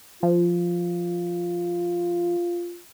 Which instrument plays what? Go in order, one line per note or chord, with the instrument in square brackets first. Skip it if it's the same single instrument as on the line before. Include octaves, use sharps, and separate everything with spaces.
[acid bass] F3 [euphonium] F4